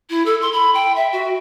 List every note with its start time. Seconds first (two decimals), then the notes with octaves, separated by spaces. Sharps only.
0.10 E4
0.26 A4
0.41 C6
0.53 B5
0.74 G5
0.96 E5
1.13 F#4